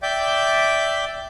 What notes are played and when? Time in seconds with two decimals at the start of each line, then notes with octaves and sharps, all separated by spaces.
0.03 D5 E5 G5 D6 G6